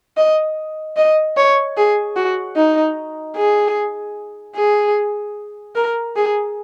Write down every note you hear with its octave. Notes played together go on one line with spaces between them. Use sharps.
D#5
D#5
C#5
G#4
F#4
D#4
G#4
G#4
A#4
G#4